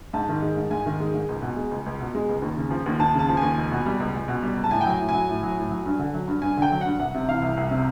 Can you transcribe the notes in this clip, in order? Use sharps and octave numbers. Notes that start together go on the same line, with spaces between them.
G#2 A5
D#3
G#3
G#2
G#2 G#5
D#3
G#3
G#2
C#2
B2
G#3
C#2
C#2
B2
G#3
C#2
D#2
C#3
F3
D#2
D#2 A5
C#3
A5
F3
D#2 G#5
C#2
B2
G3
C#2
C#2
B2
G3
C#2
A5
A2 G#5
G5
F#3 G#5
A2
F#3 G#5
A2
F#3
A2
F#3
G2
D3
F#3
G2
G2 G#5
D3 G5
F#3
G2 F#5
C2 F#5
C3
E3 F5
C2
C2
C3